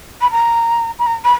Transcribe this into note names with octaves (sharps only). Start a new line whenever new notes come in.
B5
A#5
B5
A#5
B5